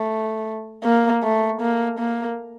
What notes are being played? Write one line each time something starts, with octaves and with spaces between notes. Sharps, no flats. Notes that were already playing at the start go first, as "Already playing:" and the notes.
Already playing: A3
A#3
A3
A#3
A#3